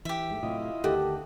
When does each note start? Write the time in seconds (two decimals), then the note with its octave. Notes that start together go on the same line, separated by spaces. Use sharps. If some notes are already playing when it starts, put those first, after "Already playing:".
0.05 E3 G4 E5
0.30 G#2 A3
0.43 A2 C3 F#3 E4 F4 D#5
0.84 D2 D3 D#3 F#4 G4 A4